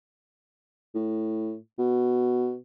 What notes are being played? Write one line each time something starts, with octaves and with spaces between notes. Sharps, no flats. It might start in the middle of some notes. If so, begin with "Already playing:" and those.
A2
B2